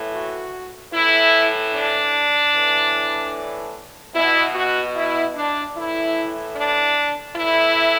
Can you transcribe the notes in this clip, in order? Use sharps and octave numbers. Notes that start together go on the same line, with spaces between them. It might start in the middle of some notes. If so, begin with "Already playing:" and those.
Already playing: A2 E3
F#4
A2 E3 E4
D4
A2 E3
B2 E4
F#4
E4
D4
A2 E3 E4
D4
A2 E3 E4